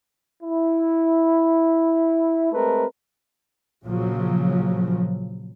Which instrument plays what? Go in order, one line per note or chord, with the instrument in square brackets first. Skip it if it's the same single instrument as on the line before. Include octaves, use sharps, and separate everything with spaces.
[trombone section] E4
G#3 A3 C4 A#4 B4
[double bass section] A#1 C#3 F3 F#3